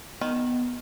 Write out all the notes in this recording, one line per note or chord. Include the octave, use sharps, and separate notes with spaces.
D#3 B3